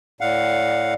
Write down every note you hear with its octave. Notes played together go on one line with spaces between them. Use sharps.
A2 D5 F5 F#5